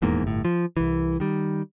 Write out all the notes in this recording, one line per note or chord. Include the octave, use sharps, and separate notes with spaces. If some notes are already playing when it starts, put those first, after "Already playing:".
D#1 E2 G#2 A#3
G1 A2
F3
C2 E3
D#3 G3